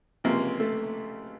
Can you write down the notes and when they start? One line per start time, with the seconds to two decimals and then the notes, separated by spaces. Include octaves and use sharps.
0.24 C#2 C3 F3 A#3
0.60 A3